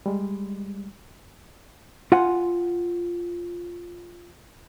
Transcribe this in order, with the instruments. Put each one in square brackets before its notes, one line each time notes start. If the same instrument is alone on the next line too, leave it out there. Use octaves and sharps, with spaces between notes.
[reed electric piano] G3 G#3
[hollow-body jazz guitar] F4 F#5 G#5